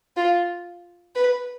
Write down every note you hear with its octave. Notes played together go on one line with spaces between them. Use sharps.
F4
B4